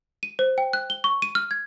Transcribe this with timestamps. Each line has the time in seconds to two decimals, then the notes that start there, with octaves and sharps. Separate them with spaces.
0.23 D#7
0.39 C5
0.58 G5
0.73 F#6
0.90 G7
1.04 C#6
1.22 D#7
1.35 F6
1.51 G#6